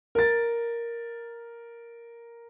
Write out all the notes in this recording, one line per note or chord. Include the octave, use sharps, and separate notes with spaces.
A#4 A6